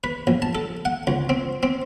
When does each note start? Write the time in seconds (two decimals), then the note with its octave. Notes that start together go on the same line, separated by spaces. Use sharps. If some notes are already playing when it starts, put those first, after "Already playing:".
0.04 B4
0.27 A#1
0.42 A5
0.55 A4
0.85 F#5
1.07 C#2
1.29 C4
1.63 C4